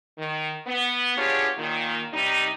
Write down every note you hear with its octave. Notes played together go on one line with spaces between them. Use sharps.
D#3
B3
B3 D4 F4 G4 G#4 C#5
A#2 D#3
C3 G3 D#4